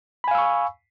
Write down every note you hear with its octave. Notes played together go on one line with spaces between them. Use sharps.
F5 G#5 B5 C#6 E6